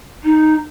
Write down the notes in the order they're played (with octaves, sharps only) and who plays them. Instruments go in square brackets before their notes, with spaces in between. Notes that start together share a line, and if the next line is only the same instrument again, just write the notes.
[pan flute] D#4